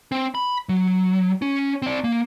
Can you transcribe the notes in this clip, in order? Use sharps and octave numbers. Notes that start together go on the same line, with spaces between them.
C4
B5
F#3
C#4
C4 D5
A#3